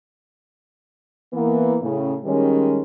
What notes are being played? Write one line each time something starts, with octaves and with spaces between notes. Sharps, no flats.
E3 A#3 B3
A2 C#3
D#3 G3 G#3 C#4